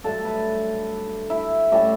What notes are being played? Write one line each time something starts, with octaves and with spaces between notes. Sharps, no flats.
G2 D3 F#3 A3 A4
B4
E4
A2 G3 C#4